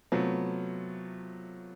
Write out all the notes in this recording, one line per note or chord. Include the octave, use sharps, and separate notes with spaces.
C3 F#3 A3 B3 F4